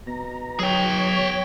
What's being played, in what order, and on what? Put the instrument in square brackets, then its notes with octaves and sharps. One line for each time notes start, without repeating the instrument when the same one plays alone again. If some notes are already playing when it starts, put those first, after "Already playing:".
[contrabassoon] B2 [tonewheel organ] A#5
[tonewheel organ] F#3 [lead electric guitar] G#4 G5 [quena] C#5